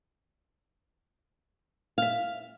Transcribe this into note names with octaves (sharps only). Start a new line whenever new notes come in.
E5 F5